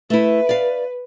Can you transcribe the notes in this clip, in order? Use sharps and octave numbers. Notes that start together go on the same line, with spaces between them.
A3 E4 B4
D5 F5